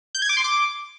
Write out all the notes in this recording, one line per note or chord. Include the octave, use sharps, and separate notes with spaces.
G6
G#6
D6
C6
D6